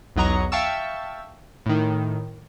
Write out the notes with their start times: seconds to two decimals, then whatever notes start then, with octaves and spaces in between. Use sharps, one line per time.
0.16 B1 E2 F#3 D#5 A#5 C#6
0.52 E5 F5 G5 A5 C#6 E6
1.66 A2 D#3